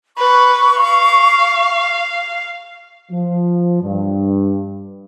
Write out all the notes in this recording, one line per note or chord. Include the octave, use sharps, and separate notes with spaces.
B4 C#6
F5
F3
G2